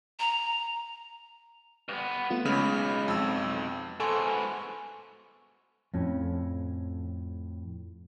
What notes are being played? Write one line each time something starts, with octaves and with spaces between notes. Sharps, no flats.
A#5
G2 B3
A3 B3 F4
B1 C#3 G#3 B5
F2 E6
G#2 B2 A4 G#5 C6 C#6
F2 A2 C#4